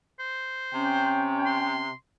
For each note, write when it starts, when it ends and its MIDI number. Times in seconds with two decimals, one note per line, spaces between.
0.19 1.30 72
0.74 1.91 48
0.74 1.82 61
0.74 1.77 79
1.46 1.93 84